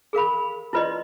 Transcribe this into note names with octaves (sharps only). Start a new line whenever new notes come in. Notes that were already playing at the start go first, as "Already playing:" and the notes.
G#4 A#4 F5 B5
E4 F4 B4 D5 D#5 C6